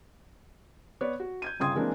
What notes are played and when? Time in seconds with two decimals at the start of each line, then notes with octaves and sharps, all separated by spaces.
1.01 B3 B4 C#5 D5
1.20 F#4
1.42 G6 G#6 D#7
1.60 G1 C#3 G5 C6 D#6 G#6
1.75 E3 G#3 A#3 C4 D4